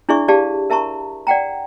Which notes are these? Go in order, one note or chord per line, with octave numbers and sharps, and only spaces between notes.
D4 E4 G#4 D5 E5 C#6
G4 G#4 D5 F5 A5
A#4 E5 A5 A#5 C#6
D5 F#5 G5 A#5